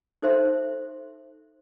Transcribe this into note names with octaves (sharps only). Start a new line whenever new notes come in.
D#4 A4 C5 E5 C6